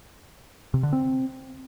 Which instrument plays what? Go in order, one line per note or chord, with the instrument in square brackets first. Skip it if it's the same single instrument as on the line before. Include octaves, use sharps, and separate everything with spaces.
[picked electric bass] C3
D3
C4